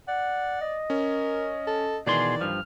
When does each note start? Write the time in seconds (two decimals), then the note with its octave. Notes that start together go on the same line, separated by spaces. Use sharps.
0.08 D5 F#5
0.62 D#5
0.90 C#4 A#4
1.67 A4
2.07 B2 D#3 E3 G#4 D5 C6
2.41 G2 F3 F6